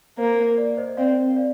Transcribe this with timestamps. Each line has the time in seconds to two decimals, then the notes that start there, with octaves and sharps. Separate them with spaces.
0.18 A#3 C5
0.58 D5
0.77 C5 D#5
0.97 C4 D5 F5
1.36 D5 F5